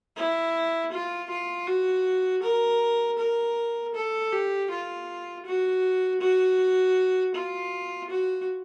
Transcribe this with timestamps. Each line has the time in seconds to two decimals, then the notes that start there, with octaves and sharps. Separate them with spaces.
0.16 E4
0.92 F4
1.30 F4
1.67 F#4
2.43 A#4
3.18 A#4
3.95 A4
4.32 G4
4.70 F4
5.45 F#4
6.21 F#4
7.34 F4
8.10 F#4